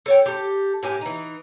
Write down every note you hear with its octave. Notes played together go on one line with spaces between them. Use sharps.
A4 C#5 G5
G4 A4
A2 G4 G#5
E3 D#4